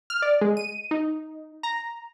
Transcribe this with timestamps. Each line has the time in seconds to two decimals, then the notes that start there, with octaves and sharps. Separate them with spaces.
0.10 F6
0.22 D5
0.41 G#3
0.57 D#7
0.91 D#4
1.63 A#5